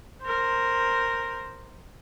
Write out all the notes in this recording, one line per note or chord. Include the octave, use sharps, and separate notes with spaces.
A#4 C5